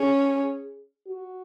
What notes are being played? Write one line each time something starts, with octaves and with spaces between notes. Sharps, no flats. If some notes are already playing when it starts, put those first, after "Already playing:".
Already playing: C#4 G#4
F#4